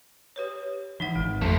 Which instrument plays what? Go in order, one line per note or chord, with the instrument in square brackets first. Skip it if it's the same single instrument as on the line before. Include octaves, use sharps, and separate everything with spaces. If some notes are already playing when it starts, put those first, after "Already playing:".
[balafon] G4 B4 C#5
[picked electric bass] E3 [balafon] D4 D#4 F#5
[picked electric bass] G#1 [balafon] G#3
[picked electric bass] F2 [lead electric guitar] A3 C5